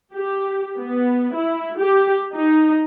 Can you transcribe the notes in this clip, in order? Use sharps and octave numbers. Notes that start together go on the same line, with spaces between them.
G4
B3
E4
G4
D#4